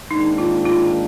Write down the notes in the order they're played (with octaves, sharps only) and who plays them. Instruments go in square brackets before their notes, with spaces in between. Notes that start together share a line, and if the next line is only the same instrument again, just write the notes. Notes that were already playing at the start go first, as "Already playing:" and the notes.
[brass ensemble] G#2 D#3 A#3 D4 [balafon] D#4
[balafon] F4
F4